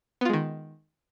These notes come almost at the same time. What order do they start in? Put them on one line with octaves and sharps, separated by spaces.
B3 F4 G#3 D#3